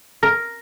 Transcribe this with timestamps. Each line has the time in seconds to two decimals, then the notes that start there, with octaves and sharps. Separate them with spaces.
0.23 A#4